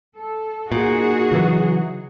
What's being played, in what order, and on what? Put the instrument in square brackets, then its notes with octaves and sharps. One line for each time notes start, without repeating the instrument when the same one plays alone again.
[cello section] A4
[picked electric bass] A#2 [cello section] D#4 F#4 G#4
[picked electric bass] C#3 E3 F#3